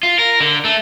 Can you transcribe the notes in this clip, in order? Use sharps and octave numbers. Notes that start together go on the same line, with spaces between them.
F4
A#4
D3
A3